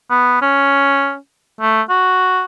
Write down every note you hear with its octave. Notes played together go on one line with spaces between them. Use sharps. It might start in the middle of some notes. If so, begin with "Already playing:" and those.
B3
C#4
A3
F#4